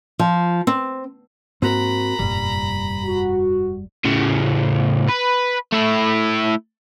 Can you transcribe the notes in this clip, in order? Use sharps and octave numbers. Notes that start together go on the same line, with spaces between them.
F3
C4
G#2 A#3 C4 F#4 A#4 A#5 B5
F1 G2 A#2 G3
F#4
A2 C#3
B4
A3 E4